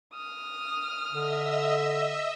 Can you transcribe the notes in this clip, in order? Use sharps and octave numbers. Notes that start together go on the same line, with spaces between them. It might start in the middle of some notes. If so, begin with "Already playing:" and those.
D#6 F6
D3 D#5 E5 E6